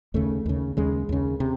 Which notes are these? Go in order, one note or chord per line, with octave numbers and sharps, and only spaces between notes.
D#2 C#3 A3
D#2 C#3
D#2 C#3 G#3
D#2 C#3
C3